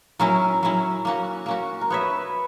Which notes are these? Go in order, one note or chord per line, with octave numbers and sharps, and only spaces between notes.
F#3 C#4 E4 A#4
F#3 C#4 E4
A#3 C#4 F#4
A#3 C#4 F#4
A#4
B3 F#4 B4 C#5 E5